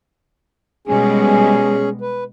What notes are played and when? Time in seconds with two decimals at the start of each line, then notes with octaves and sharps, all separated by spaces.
0.87 B2 G3 G#3 C#4 G#4
2.01 B4